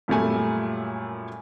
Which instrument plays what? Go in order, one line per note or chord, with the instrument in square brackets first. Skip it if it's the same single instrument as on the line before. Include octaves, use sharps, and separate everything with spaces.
[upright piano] F#2 A#2 G3 A3 G#5